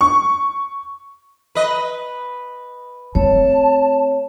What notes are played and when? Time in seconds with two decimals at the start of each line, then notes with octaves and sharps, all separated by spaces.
0.01 C#6
1.55 B4 D#5
3.15 A3 C4 C#5 A5